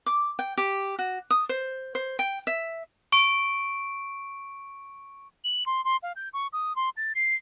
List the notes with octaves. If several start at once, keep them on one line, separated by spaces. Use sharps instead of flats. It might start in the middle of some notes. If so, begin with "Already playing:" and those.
D6
G5
G4
F#4
D#6
C5
C5
G5
E5
C#6 D7
F#7
C6
C6
F5
G6
C#6
D#6
C6
A6
C7